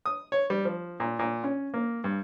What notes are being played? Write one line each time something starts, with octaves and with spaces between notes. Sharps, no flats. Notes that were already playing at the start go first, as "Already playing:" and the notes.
D#6
C#5
G3
F3
A#2
A#2
C#4
A#3
G2